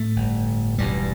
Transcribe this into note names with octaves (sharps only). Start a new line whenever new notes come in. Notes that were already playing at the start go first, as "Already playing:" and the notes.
Already playing: A2 A3
G1 G2
E1 E2 G2 B2 G3